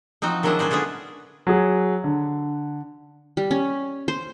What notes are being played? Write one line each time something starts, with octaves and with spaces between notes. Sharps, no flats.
F3 C4 D#4 F#4
D#3 F#3 G#3 D4 E4 D#5
C#4 B4 C5 D5
D3 G#3 B3 F4 G#4
F#3 G#4
D3
G3
C#4
C5